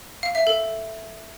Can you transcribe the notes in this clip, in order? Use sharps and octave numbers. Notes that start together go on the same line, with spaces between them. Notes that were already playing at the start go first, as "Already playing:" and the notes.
F5
E5
A4